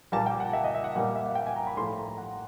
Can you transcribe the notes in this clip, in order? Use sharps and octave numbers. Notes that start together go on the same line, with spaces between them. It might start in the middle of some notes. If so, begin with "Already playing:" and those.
A#2 G3 A#3 A5
G5
F#5
E5
D#5
E5
F#5
A#2 G3 A#3
F#5
E5
F5
G5
G#5
A#5
B5
A2 F3 A3 C6
B5
A#5
A#5
F#5